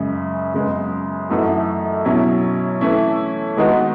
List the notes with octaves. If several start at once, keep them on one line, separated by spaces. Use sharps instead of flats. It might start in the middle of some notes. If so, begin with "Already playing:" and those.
Already playing: F#2 C#3 G#3
F#2 C#3 G#3 B3
F#2 E3 A3 D#4 F#4
B2 F#3 C#4 E4
E3 A3 C#4 E4
D#3 G#3 B3 D#4 F#4